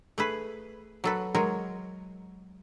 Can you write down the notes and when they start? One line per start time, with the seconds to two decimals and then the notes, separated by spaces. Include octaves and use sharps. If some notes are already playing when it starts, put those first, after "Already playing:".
0.18 A3 G#4 B4
1.04 F#3 A4 B4
1.35 F#3 G#3 A#4 C#5